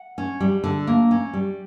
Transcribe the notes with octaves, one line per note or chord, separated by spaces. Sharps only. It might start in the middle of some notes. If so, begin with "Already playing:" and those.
Already playing: F#5
C#4
G3
D3
A#3
C#4
G3